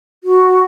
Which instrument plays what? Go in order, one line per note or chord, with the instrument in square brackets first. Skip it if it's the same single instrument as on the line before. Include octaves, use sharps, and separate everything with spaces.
[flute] F#4